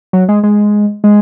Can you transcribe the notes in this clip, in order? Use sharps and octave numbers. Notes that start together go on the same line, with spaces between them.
F#3
G#3
G#3
G#3